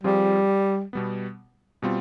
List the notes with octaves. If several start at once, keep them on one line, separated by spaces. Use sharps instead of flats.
F3 G3 C4 F4 G#4
B2 G3 B3
B2 G3 C4 F4